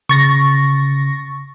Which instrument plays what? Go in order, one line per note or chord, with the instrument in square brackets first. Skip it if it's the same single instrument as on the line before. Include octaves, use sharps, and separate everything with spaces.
[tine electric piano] C#3 [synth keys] C#6 A6 A#6